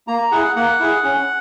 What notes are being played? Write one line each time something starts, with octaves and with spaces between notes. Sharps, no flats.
A#3 A#5
E4 G#4 F#5
A#3 F#5
E4 G#4
C#4